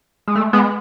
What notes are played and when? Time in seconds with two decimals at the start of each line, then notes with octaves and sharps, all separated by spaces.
0.28 G#3
0.36 A3
0.53 G#3 B3